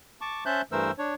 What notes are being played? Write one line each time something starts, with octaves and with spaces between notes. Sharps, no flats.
A5 C#6 D6
C#4 C5 E5 A5 F#6 G6
G2 E3 A3 A#4 C5 E6
D4 C#5